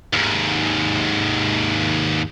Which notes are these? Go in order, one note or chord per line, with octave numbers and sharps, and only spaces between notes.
D#2 G#2